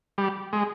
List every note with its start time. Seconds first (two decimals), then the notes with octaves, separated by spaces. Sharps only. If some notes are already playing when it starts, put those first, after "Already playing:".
0.18 G3
0.53 G#3